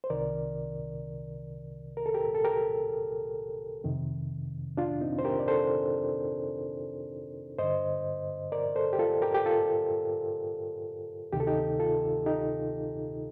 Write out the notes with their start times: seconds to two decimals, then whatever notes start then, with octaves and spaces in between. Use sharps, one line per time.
0.04 C5
0.10 C2 C3 D#3 A#4 D5
1.97 A#4
2.06 A4
2.14 G4 A#4
2.35 A4
2.44 G4 A#4
3.84 F2 C3 D#3
4.77 D4 F4
5.01 C4 D#4
5.19 C5
5.24 G4 A#4
5.40 D5
5.48 A4 C5
7.58 G2 D3 C5 D#5
8.52 A#4 D5
8.76 A4 C5
8.93 G4
8.99 F4 A4
9.22 G4 A#4
9.34 G4
9.46 F4 A4
11.32 D2 C3 D#3 G4
11.40 A4
11.47 D#4 G4
11.79 F4 A4
12.26 D#4 G4